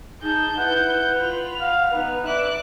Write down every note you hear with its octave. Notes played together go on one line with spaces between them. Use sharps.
D#4 G#4 A5 G6
E4 B4 F#5
F4 B5 F7
F5 F#5
B3 D#4 B4
D5 E5 D6 F#6